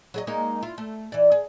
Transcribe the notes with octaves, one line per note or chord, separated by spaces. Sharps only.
F#3 G#4 D#5
G#3 A#3 D#4
E4 F4
A3
E3 D5
G#4